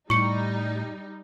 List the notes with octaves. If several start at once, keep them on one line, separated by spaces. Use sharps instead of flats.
A2 G3 D#4 C#6 C#7